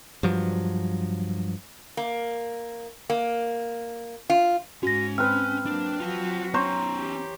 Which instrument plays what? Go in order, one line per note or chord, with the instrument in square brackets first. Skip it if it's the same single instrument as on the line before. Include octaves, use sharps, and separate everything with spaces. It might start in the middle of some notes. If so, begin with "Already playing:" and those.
[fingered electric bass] G2 F3 F#3
[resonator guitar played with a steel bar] A#3
A#3
F4
[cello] G#2 [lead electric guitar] C#4 [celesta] F#4 A#6
[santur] C4 B4 [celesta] F6
[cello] F#3 A#3 [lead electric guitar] D4
[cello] F#3 F#4 [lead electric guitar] F4 A5
[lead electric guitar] B3 C#4 [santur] C5 C#5 A#5
[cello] E3 G4